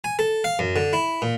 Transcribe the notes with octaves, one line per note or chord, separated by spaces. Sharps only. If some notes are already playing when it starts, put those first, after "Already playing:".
G#5
A4
F5
F#2
D3
E4
A#2